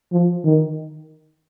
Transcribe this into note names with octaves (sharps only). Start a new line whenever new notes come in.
F3
D#3